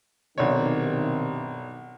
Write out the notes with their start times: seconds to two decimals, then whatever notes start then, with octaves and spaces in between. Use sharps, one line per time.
0.38 B1 G2 C3 D#3 D4 C#5